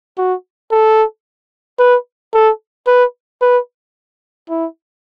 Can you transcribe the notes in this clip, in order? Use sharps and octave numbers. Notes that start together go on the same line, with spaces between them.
F#4
A4
B4
A4
B4
B4
E4